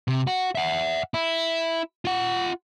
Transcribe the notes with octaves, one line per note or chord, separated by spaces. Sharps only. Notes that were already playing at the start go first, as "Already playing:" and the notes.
C3
F#4
E5 F#5
E4
F4 F#5